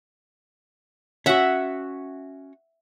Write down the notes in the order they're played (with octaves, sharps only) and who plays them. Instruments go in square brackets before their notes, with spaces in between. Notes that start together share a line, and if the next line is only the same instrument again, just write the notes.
[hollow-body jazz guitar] C#4 F#4 [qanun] E5 F#5